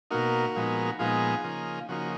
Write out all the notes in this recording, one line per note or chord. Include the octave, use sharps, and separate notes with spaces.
B2 A#3 D#4 F#4 A#4
A#2 F3 G#3 B3 D#4
A#2 F3 G#3 B3 D#4 F4 G#4
C#3 F3 A#3 D#4
C#3 F3 A#3 D#4 F#4